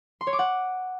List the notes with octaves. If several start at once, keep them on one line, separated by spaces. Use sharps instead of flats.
C6
C#5
D6
F#5